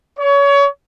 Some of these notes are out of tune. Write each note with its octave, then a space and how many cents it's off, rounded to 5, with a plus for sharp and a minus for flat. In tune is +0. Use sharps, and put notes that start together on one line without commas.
C#5 +25